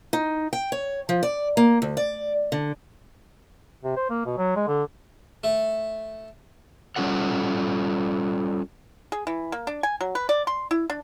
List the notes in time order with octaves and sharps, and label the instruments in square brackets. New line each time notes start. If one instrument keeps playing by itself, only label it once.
[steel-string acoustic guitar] D#4
G5
C#5
F3
D5
A#3
D2
D5
D3
[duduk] C3
C5
A#3
B2
F#3
G#3
D3
[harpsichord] A3
[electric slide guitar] G3 C#4 F4 A4 F#5
[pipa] G#4
E3
A#3
D4
G#5
F#3
B4
D5
C6
E4
D4